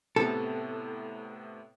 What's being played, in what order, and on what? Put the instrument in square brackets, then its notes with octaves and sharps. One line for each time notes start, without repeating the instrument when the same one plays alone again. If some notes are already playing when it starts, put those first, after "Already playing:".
[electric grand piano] A2 C3 B3 [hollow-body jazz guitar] A4